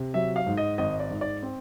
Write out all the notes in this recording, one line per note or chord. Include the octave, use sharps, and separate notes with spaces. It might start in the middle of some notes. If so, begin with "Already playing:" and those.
Already playing: C3
F#3 E5
F5
G#2
D#5
G#1 D#5
D5
G#2
D5
C4